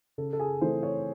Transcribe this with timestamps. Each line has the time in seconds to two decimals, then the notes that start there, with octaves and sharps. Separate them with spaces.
0.18 C#3 A4
0.33 A4
0.40 G#4
0.61 E3 A3 C4 C5
0.83 C#5